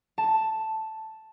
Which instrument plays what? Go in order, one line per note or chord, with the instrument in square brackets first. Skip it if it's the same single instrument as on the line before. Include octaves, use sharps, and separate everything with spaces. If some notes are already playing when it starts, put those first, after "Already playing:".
[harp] A5